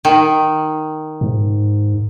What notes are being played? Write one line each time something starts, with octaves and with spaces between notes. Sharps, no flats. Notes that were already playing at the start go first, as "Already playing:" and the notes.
D#3
G#2